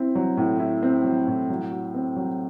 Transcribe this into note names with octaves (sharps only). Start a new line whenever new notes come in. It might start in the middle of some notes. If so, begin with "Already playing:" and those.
Already playing: C4 E4
F#3
A2
E4
C4
F#3
A2
F#3
F#4
C4
F#3